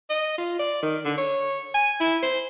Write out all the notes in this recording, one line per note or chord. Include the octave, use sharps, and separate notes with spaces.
D#5
F4
D5
D#3
D3
C#5
G#5
E4
C5